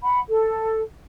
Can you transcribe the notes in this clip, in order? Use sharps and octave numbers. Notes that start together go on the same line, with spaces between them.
F#5 B5
A4